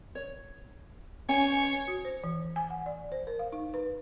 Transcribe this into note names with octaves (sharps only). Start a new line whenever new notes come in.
C#5
C#4 C#5 G#5
F#4
C5
E3
G#5
F#5
D5
C5
A#4
F5
D#4
B4